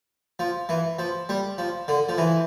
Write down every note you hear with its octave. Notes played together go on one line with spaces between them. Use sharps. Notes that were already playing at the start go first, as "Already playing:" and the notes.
F3
E3
F3
G3
F3
D3
F3
E3